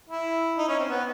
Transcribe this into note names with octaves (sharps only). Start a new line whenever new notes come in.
E4
D#4
C#4
C4
B3